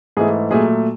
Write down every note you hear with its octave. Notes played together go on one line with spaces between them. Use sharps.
G#2 E3 A3 G#4
A#2 F#3 A3 G#4